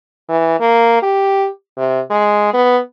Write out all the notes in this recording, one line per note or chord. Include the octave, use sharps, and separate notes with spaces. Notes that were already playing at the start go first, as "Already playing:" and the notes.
E3
A#3
G4
C3
G#3
B3